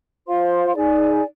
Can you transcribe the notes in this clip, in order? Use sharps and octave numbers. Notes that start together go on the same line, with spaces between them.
F4 C5 F5 C6
D#4 G#4 D5 G#5